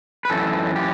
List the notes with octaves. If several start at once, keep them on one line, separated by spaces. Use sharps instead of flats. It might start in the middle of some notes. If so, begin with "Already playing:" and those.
B4
F#2 E3 A4
G4